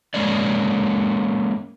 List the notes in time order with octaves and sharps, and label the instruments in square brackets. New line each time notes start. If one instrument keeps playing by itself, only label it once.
[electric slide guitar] G#3 A#3 C#4 D5